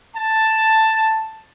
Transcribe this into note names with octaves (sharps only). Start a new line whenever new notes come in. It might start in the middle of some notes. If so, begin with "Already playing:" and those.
A5